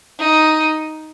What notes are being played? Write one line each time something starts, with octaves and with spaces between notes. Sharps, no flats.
D#4